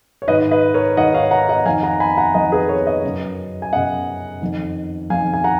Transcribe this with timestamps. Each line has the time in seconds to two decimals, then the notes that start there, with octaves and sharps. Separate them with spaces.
0.22 C#5
0.28 G#2 D#3 B4 D#5
0.51 B4 D#5
0.74 A#4 C#5
0.97 D#3 D#5 F#5
1.01 G#2
1.14 C#5 F5
1.31 F#5 A#5
1.49 D#5 F#5
1.66 F2 D#3 F5 G#5
1.83 F#5 A#5
2.00 G#5 B5
2.17 F#5 A#5
2.34 F2 D#3 D#5 F#5
2.52 G#4 B4
2.69 A#4 C#5
2.86 B4 D#5
3.03 F#2 C#3
3.62 G#5
3.72 F#2 C#3 D#5 F#5
4.42 F2 D#3
5.10 F2 D#3 F5 G#5
5.34 G#5
5.44 F#5 A#5